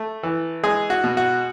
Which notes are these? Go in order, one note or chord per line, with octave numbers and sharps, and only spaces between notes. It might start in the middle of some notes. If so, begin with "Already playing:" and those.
Already playing: A3
E3
G#3 G#4
F#4
B2
F#4